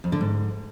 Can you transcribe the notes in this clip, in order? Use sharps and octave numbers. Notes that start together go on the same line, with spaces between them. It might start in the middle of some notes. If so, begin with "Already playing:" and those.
F2
D3
G#2